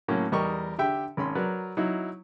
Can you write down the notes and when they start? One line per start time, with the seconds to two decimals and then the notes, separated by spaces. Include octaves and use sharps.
0.08 A2 F#3 A#3 C#4
0.32 E2 G3 A#4 D#5 C#6
0.78 D3 G4 E5 G5
1.17 G#1 C#4 B5 C6
1.35 F#3 A#4 B4 D5
1.77 F#3 D#4 E4